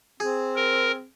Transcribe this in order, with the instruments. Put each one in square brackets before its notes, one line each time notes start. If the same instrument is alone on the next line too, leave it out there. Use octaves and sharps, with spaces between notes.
[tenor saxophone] C4 [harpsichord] G#4
[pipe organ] A#4